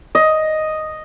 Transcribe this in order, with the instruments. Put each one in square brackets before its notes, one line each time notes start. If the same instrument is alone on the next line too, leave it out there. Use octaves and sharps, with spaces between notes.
[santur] D#5